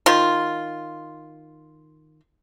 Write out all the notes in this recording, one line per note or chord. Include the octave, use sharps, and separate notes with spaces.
D#3 F4